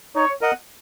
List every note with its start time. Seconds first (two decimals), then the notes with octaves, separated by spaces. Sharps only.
0.15 D#4 C#5
0.41 A#4 D#5 F#5